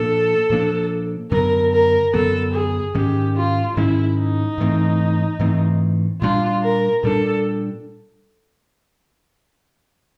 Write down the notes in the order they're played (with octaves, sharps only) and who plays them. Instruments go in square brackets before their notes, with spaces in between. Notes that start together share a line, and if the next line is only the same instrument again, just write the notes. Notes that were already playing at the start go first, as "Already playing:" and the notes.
Already playing: [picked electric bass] A#2 F3 A#3 D4 [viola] A4
[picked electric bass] A#2 F3 A#3 D4
[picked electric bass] F#2 D3 F#3 B3 [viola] A#4
[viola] A#4
[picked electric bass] F#2 D3 F#3 B3 [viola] A4
[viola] G#4
[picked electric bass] G#2 D#3 G#3 C#4 [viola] G4
[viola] F4
[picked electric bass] G#2 D#3 G#3 C#4 [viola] E4
[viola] D#4
[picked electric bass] G#2 E3 A3 C4
G#2 E3 A3 C4
[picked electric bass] A#2 G3 B3 D4 [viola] F4
[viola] A#4
[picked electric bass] A#2 G3 B3 D4 [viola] A4